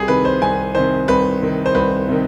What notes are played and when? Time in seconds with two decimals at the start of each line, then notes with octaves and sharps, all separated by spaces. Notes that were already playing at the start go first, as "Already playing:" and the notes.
Already playing: C2 G4 G#4
0.08 C3 D#3 B4
0.25 C5
0.41 C2 G#5
0.75 C3 D#3 C5
1.08 C2 B4
1.41 C3 D#3
1.66 C5
1.75 C2 B4
2.08 C3 D#3